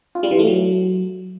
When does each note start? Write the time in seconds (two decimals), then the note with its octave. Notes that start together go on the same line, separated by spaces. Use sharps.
0.15 F4
0.23 G3
0.31 E3
0.39 A3
0.47 F#3